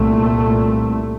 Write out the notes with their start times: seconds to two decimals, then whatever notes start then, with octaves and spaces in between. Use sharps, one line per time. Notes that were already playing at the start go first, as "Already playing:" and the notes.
Already playing: C2 A#2 A3